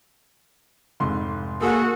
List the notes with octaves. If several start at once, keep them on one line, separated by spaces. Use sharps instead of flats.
F1 G#2 C6
A#3 F#4 G#4 A4